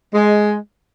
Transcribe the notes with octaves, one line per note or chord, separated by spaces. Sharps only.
G#3